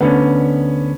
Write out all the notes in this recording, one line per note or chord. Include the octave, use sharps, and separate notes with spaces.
D2 D3 B3 C#4